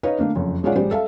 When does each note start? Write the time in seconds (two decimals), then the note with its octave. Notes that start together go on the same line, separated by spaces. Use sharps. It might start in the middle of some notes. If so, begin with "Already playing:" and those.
0.03 D#4 B4 C#5 D#5 F5
0.18 D3 A3 A#3 D4
0.36 F#1 F2
0.63 B1 G#3 F4 C#5 D5 F#5
0.75 A1 G3 G#3 C5 D5
0.91 A4 E5 F5 A5